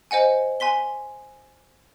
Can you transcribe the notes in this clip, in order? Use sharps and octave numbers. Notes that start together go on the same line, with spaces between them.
C5 D#5 F#5 G#5
G#5 C6 B6 G7